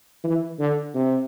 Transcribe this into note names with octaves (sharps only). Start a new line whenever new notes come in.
E3
D3
C3